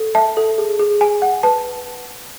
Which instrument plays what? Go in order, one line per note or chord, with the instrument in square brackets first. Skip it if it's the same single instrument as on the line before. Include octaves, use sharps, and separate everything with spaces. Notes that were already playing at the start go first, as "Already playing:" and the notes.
Already playing: [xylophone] A4
E5 A5
A4
G#4
G#4
G#4 G#5
F#5
B4 A5